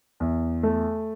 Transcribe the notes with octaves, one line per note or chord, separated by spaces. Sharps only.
E2
A3